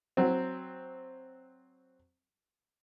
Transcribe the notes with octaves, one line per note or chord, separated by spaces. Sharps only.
F#3 C4